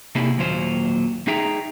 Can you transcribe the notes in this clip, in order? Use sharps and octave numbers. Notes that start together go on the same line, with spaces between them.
C3 A#3 D#4 E4 G4 G#4
D#2 A#2 F#3 F4 C5
D#4 G#4 E5 G5 A#5